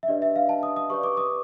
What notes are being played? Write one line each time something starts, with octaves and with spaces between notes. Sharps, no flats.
E5
D4 G4 B4 D5 D#5
E5
F5
A5
D#6
D#6
G4 B4 D5 C#6
D6
D#6